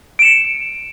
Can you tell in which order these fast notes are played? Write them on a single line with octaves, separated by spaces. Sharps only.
D7 E7 C#7